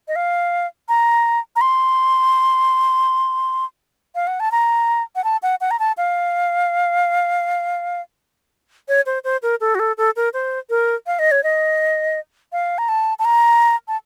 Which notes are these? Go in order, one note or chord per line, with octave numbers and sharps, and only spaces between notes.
D#5
F5
A#5
A#5
C6
F5
F#5
A5
A#5
F#5
A5
F#5
F#5
A#5
A5
F5
C#5
C5
C5
A#4
A4
F#4
A4
A4
A#4
C5
A#4
F5
D#5
C#5
D#5
F5
A#5
A5
A5
A#5
A5